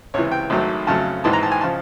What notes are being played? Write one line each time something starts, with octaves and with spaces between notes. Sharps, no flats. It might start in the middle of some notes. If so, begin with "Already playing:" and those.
C#2 C3 E3 C#5
G5
G#1 G#2 D#3 F#3 A3
F2 C#3 F#3 A3 A5
G#1 G#2 E3 A5
A#5
A5
G#5
C#3 F3 A5